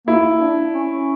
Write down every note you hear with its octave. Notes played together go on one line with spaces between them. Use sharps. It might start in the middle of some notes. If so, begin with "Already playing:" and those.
A#3 E4
D4
C#4